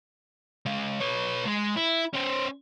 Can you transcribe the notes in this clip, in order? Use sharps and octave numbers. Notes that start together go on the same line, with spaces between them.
G#3 C#4
B4 C#5
G#3
E4
C#4 C5